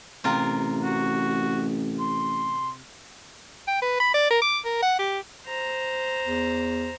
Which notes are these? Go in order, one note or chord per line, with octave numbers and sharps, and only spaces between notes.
A1 C3 F4 A#4
F#4
C6
G5
B4
B5
D5
A#4
D6
A#4
F#5
G4
C5 A#5
E2